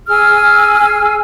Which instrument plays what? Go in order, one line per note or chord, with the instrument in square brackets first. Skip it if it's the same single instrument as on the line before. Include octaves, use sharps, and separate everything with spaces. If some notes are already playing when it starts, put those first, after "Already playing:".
[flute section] G#4 G#5 E6 F6